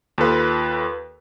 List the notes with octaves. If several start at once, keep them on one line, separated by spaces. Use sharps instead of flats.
D#2 F4 A4 B4